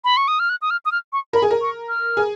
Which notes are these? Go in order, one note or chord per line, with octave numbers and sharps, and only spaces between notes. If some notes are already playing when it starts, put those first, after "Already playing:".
B5
C#6
D#6
F6
F#6
D#6
F6
D#6
F6
C#6
A#4 B5
G#4
A#4
C#6
F6
G#4